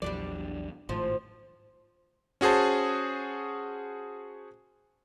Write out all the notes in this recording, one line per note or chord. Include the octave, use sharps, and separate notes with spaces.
A#1 E2 F#3 G3 D4 D5
G#1 A2 F3
C#4 F#4 G#4 C5 A5